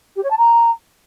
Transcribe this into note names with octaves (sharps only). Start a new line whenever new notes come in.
G4
C#5
A5
A#5